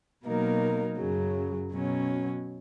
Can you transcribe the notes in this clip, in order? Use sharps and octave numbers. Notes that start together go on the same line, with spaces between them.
B2 F#3 A#3 D#4 A#4
F#2 C#3 F#3
B2 F#3 C#4